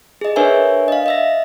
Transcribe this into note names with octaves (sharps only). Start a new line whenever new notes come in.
G#4 D#5
D4 A#4 B4 C#5 E5 G#5
D#5 F5
D#5 E5 A#6